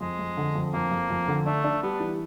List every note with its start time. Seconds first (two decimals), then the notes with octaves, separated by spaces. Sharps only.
0.01 F2 G#3
0.19 F2
0.37 D3
0.55 F2
0.74 F2 A#3
0.91 F2
1.10 F2
1.28 D3
1.46 A3 D4
1.64 D4
1.83 G3 B3
2.00 E3